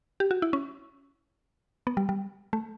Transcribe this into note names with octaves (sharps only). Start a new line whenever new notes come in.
G4
F#4
E4
C#4
B3
G3
G3
A3